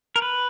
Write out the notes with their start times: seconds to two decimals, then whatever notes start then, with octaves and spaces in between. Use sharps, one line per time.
0.16 A#4
0.22 B4